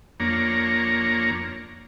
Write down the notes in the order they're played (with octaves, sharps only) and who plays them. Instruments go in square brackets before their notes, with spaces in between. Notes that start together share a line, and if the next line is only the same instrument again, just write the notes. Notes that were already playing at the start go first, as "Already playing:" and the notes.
[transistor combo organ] F2 A#3 D4 C#5 A#5